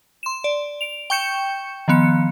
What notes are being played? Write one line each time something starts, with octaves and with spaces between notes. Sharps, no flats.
C6 E7
D5
D7 F7
G5 C#6 G6 C#7 E7
D#3 F3 B3 C#7